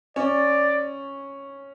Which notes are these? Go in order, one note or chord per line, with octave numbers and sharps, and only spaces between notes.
C#4 D5